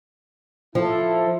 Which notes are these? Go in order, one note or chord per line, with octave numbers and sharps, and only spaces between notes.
F3 E4 A4